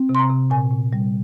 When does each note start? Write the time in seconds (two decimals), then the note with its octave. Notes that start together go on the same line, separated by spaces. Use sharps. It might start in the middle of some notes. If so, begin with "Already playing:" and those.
Already playing: C4
0.09 C3
0.15 C6
0.19 A#5
0.30 C3
0.50 A#2 G#5
0.71 A#2
0.93 G3